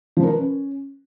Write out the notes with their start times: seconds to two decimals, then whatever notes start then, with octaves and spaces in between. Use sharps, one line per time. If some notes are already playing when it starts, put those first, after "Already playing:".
0.17 F3
0.23 A#4
0.30 B4
0.37 C#4